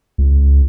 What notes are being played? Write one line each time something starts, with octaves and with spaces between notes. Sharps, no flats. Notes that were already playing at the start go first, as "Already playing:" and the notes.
C#2